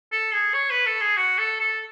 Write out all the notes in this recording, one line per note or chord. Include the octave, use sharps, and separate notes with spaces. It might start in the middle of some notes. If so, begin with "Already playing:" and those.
A4
G#4
C#5
B4
A4
G#4
F#4
A4
A4